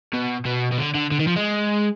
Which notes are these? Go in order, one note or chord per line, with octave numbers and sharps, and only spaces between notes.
B2
B2
B2
D3
D3
D3
D#3
F3
G#3